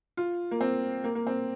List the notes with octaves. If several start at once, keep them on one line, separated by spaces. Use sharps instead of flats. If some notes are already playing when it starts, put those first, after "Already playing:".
F4
A#3
C4
A#3
A#3
C4